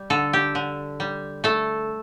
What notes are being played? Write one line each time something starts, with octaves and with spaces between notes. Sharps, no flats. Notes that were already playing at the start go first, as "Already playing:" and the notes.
Already playing: G3
D3 A4
G4
D3
G3
A3 A4